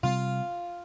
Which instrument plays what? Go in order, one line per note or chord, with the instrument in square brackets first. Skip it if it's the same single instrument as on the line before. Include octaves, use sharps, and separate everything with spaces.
[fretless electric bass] C3 G3 C4 [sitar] F4